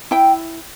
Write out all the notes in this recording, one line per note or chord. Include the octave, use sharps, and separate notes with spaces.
E4 G5